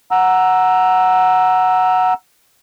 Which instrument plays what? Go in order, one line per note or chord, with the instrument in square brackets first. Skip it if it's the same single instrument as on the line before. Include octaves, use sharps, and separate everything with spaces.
[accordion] F#5 A#5 E6